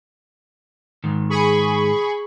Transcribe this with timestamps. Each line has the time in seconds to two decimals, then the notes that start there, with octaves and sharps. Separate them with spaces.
1.04 G#2 D#3
1.30 G#4 B5 C#6